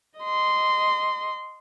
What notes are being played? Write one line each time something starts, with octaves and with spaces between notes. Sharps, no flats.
D#5 C6